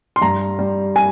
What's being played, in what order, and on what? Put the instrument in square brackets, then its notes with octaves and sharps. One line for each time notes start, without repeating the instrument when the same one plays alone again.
[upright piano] C6
G2 A#5
G3
G#5